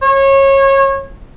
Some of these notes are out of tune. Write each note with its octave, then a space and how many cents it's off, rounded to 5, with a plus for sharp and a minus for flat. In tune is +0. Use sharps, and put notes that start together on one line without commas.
C#5 -25